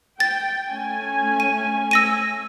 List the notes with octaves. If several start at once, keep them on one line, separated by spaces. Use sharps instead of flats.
G5 A6
A3 C#4 G#5
D#7
E6 A#6 D#7